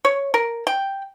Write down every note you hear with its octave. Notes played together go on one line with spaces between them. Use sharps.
C#5
A#4
G5